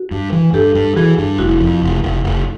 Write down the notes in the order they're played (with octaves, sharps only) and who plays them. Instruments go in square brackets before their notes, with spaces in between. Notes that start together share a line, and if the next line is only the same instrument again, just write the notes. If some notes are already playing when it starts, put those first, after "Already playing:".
Already playing: [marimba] F#4
[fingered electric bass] G2
E3
[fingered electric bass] G2 [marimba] G4 A4
[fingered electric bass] G2
[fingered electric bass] E3 [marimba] F#4 G#4
[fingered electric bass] G2
[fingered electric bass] F1 [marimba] E4 F#4
[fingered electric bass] F2
F1
F1
F1